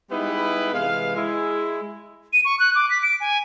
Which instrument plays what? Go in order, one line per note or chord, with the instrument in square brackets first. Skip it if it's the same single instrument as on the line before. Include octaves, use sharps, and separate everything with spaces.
[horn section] G3 G#3 B3 D#4 E4 B4
C3 E3 G#3 B4 F5
G#3 E4
[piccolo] D#7
C#6
F#6
D6
B6
D7
G#5